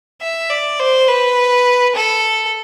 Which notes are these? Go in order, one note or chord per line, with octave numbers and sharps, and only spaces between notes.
E5
D5
C5
B4
A4